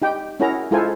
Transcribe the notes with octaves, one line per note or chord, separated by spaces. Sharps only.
D#4 G4 G5
C#4 E4 F#4 G#4 A#4 A#5
G#3 E4 F4 A4 C5 G#5